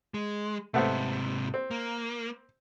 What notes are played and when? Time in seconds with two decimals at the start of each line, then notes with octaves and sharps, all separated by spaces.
0.14 G#3
0.74 G#2 C3 A3 B3 C4
1.54 C4
1.71 A#3